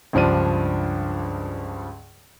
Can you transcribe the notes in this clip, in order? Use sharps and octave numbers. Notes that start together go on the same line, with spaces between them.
C#2 G2 F3 D4 D#7